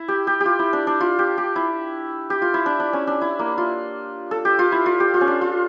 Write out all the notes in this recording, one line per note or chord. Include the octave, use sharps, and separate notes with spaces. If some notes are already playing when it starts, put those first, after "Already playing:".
Already playing: E4
G4
G4
G4
F4
E4
D4
D4
F4
G4
G4
E4
G4
F4
E4
D4
D4
C#4
D4
E4
A#3
F4
A4
G4
F4
E4
F4
G4
F4
C#4
D4
F4